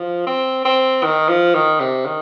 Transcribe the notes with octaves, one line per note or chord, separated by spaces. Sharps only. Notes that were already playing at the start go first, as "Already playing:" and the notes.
Already playing: F3
C4
C4
D#3
F3
D#3
C3
D#3